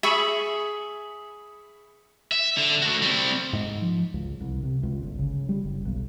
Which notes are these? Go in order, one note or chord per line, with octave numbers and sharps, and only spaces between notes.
G#4 E5 B5 C#6
E5
D3
A3 F#4
G3 C4
G#2
F3
C#2
C2
C3
C#2
G1
C#3
G3
F#1
B1